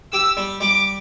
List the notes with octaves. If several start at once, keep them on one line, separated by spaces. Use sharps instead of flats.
G4 E6
G3
G3 D6